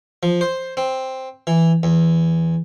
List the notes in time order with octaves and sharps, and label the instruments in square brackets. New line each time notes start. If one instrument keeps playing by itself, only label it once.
[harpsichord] F3
C5
C4
E3
E2